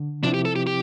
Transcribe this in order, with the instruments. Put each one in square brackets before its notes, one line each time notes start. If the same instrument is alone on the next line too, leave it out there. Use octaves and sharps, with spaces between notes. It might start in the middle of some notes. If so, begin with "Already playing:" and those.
Already playing: [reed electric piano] D3
[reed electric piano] C3 F3 C4 E4 [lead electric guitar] D4
[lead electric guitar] G4
A4
G4
G4